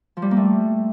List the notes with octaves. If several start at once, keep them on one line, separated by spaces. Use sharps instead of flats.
F3
G3
A#3
A3